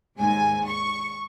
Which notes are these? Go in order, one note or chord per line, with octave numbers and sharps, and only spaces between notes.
D#2 G#2 G#5
C#6